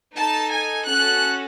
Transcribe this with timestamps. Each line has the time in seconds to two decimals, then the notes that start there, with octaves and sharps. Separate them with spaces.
0.16 D#4 A4 A5
0.51 G#5
0.86 C#4 F#4 A4 F#6